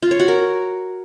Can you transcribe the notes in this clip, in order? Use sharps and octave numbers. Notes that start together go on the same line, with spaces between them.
F4
C#5
F#4
A#4